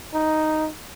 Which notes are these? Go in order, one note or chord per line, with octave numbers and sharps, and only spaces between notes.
D#4